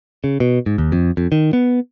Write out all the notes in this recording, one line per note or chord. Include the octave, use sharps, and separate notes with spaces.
C#3
B2
G#2
D#2
F2
F2
D#3
B3